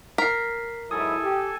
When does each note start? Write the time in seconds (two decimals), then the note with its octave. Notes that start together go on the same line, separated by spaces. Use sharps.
0.18 A#4 B6 C7
0.91 G#2 F#3 E4 A4 G#5 D#6
1.23 G4